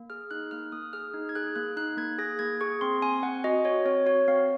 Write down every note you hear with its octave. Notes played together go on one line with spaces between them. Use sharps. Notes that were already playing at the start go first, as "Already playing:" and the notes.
Already playing: A#3
G#4 F6
D#4 F#6
A#3 F6
A#3 D#6
G#4 F6
D#4
G#6
G#4 F#6
A#3 F#6
D#4 F#6
A#3 G#6
G#4 A#6
A#3 G#6
G#4 C#6
C4 C6
C4 G#5
C4 F#5
F#4 D#5
F#4 C#5
C4 C#5
F#4 C#5
C4 F5